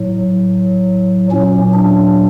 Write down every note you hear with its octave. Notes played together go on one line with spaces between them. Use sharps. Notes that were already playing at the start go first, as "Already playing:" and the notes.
Already playing: A2 F#3
A#2 F#3 C#4
D4